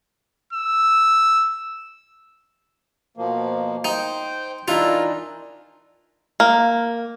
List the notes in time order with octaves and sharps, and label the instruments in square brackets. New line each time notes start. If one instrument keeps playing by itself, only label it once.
[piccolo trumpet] E6
[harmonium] B2 F3 A#3
[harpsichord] D#4 [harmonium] C5 G5
[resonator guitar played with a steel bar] E3 D4 D#4 [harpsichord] F4 [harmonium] A#4
[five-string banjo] A#3